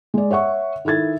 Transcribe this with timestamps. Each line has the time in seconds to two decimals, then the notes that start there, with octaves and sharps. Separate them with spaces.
0.14 G#3 D5
0.31 C#5 E5 F#5 C#6
0.85 D#3 E4 A4 G#6 A6